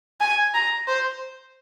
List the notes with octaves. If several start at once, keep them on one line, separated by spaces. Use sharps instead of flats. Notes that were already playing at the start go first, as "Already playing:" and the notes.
G#5
A#5
C5